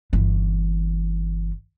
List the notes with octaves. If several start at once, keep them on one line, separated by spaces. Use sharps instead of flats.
G1 E3